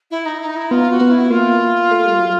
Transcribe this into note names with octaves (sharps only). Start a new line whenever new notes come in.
E4
D#4
D#4
E4
B3 F4
F#4
B3
E4
A#3 F4
A3
G3
F#3